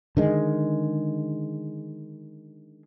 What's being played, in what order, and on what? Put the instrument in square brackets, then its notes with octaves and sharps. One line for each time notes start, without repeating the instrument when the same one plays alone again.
[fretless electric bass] D3 D#3 G#3